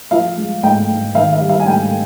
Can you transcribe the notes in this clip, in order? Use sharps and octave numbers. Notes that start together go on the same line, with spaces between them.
F3 F5
G#3
G#2 G5
G#2
D#3 F5
F5
G3
F5
G#5
G#2 G5